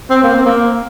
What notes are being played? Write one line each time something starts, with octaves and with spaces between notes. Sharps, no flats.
C4
A#3
C4
A#3